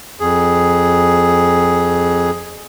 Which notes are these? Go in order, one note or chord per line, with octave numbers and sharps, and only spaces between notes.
F2 G#4